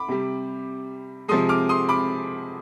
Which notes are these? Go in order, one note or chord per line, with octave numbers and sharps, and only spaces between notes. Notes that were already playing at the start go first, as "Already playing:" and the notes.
Already playing: B5 D6
C3 G3
C3 F3 G#3 C6 D#6
D6 F6
C6 D#6
B5 D6